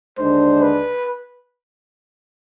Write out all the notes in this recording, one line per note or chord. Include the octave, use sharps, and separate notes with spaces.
D#2 D3 G#3 D4 C5
B4